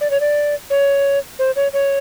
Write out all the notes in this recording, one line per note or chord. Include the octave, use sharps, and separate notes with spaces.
D5
C#5
D5
C#5
C5
C#5
C#5